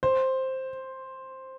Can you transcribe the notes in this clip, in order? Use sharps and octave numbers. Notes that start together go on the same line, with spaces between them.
C5